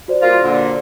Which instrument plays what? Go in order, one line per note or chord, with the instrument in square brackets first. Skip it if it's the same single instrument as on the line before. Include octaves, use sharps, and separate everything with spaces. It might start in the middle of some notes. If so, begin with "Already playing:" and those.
[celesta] F#4 C5 D5
[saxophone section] G3 A#3 F4
A#2 D3